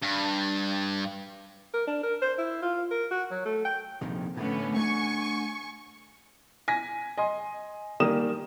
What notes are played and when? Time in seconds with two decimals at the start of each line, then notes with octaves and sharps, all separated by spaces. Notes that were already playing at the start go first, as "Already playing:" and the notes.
0.02 G2
1.74 A#4
1.88 D4
2.03 A#4
2.22 C5
2.38 E4
2.63 F4
2.91 A#4
3.11 F#4
3.31 F#3
3.46 A3
3.65 G5
4.01 A#1 F2 C3 D#3
4.37 A2 D3 A3 B3 C#4
4.76 A3 D4 G#5 C#6
6.68 G#5 A#6 B6
7.17 D#5 G#5 C6
8.00 D#3 G3 A#3 D#6 E7